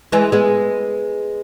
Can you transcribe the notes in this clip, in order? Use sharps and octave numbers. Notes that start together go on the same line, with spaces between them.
E3 G#3
G#3 B3